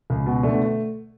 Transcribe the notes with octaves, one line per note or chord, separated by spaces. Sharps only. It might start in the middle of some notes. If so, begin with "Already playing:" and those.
C#2
B2
D3 A3 D4